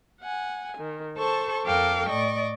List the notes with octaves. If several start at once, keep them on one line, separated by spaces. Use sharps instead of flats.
F#5 G#5
D#3
A4 C5 A5 C#6
F2 A4 A#4 F5 G5 D6
A2 D5 D#5 C#6